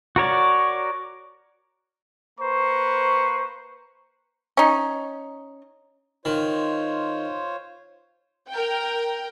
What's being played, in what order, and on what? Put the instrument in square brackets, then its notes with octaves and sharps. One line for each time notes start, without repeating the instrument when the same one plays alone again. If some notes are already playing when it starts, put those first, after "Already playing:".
[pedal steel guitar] F#4 A#4 C#5 D5
[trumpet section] A#3 B4 C5 A#5 C#6
[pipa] C#4 D#4
[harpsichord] D#3 [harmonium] F4 C5 C#5
[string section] A#4 G5